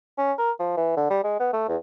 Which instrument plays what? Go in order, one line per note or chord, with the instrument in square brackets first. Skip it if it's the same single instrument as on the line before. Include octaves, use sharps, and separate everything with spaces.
[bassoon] C#4
A#4
F3
E3
D3
G3
G#3
B3
A3
E2